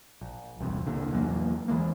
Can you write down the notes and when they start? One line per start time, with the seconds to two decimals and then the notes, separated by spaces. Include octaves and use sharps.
0.21 A#1
0.61 E1 C2 F2
0.87 C2 A#2 D3
1.12 E2 F#3 A#3
1.68 E3 F3 G#3 A#3